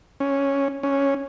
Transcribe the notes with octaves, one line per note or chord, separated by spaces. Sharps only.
C#4
C#4